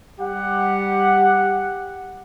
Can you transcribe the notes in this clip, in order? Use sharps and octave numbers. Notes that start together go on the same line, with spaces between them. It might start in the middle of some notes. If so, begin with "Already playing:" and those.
G3 G4 F#5